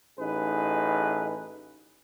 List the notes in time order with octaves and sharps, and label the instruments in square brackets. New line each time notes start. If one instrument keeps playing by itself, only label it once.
[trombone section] A1 D#4 G#4 B4